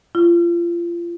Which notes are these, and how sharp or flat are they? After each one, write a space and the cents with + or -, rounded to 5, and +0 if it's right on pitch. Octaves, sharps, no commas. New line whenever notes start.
F4 -30